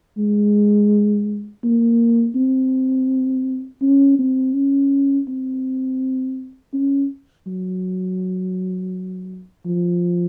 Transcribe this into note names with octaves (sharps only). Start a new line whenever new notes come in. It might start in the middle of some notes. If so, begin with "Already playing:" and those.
G#3
A#3
C4
C#4
C4
C#4
C4
C#4
F#3
F3